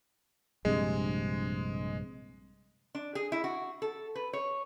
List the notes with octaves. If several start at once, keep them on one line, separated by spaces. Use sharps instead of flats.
A#1 G2 C3 G#3
D4
G#4
E4
F#4
A4
B4
C#5